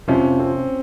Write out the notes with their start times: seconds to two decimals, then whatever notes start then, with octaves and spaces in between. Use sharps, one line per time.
0.08 F2 C3 F3 C#4
0.39 C4